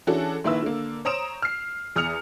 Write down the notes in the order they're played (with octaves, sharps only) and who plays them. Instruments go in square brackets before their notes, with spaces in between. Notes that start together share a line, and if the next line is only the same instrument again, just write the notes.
[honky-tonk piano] E3 C#4 D4 F#4 G#4 A4
A#1 D#3 A#3 E4 B4 E6
D3 A#3
C5 C#5 A#5 D#6 D7 E7
F6 C7
E2 D#6 F6 C#7 F7